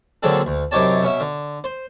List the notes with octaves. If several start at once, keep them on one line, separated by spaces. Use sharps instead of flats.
A#2 D3 F#3 C4 G#4 A4
D2
F#2 C3 D#4 G4 C#5 A5
B2 C#4 E5
D3
C5